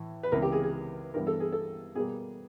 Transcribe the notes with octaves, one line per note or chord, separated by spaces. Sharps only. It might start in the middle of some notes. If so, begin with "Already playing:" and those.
Already playing: A2 E3
B4
C#2 C3 E3 A#4
G4
G#4
G#4
G2 E3 G3 B3 A#4
A4
G#4
A4
B2 G3 A#3 G#4